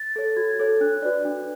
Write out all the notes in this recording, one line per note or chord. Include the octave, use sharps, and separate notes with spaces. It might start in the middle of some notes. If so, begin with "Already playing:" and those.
Already playing: A6
A4 C#5
F#4 G#6
A4 C#5
D4 F#6
F#4 B4 D5
D4